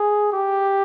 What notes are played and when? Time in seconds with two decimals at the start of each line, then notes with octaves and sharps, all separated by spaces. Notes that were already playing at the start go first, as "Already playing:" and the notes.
Already playing: G#4
0.33 G4